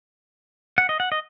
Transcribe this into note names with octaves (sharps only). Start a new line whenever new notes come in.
F#5
D#5
F#5
D#5